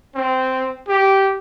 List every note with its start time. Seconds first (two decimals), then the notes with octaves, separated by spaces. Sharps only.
0.15 C4
0.88 G4